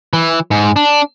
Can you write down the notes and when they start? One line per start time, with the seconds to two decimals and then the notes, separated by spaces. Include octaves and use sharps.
0.13 E3
0.51 G#2
0.76 D4